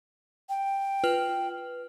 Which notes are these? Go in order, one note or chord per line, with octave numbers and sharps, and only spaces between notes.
G5
F4 B4 F6